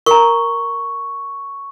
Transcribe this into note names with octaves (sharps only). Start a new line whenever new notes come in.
A#4 A#5 C#6